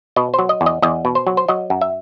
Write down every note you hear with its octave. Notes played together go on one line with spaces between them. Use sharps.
B2 D#5
F#3 C5
D#5
E2
D#5
E2 D#5
B2
C5
F#3
C5
F#3 D#5
F#2
E5